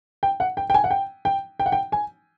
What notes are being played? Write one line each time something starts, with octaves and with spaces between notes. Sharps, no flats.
G5
F#5
G5
G5
G#5
F#5
G5
G5
G5
F#5
G5
G#5